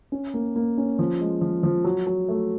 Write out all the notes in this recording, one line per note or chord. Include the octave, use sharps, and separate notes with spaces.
C#4
A#3
A#3
C#4
F3
G#3
F3
F3
F#3
F#3
A3